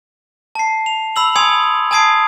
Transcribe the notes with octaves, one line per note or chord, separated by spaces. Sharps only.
A5 C7
F7
B5 E6 F#7
G#5 C6 D#6 G#6 C#7 F7
G#5 A5 D#6 G#6 C7 D7